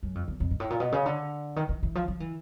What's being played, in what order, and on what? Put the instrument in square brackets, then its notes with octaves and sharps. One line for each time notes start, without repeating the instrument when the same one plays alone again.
[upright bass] F#2
F2
E2
F2
G#2
A2
A#2
B2
C#3
D3
D#3
E3
E3
F3
F3
E3